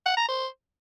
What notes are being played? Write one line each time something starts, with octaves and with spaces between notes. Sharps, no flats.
F#5
A#5
C5